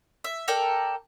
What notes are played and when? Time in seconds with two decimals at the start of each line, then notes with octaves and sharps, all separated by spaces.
0.24 E5
0.48 A4 A#4 D5 G5